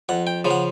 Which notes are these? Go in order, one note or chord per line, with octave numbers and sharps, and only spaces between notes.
F2 F#5
G5
C#3 F3
F#5